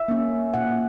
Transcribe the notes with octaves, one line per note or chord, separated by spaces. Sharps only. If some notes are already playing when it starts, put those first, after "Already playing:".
Already playing: E5
A#3 C#4
A#2 F#5